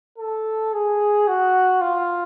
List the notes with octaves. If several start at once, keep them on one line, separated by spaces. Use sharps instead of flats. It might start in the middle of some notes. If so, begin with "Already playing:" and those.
A4
G#4
F#4
F4